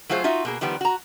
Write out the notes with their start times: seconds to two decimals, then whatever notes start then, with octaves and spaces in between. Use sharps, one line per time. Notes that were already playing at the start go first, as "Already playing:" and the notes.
0.09 F#3 A3 F4 G#4 C5
0.24 D#4 F4 F#4 E5
0.45 B2 A#3 G#4
0.61 D#3 F3 G3 B3
0.81 F#4 A#5